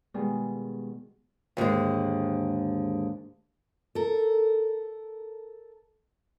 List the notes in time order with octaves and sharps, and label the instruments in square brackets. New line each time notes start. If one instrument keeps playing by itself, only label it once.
[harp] B2 D#3 G3 G#3
[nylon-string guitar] D#2 G#2 D3 G#3
[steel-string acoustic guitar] A4 A#4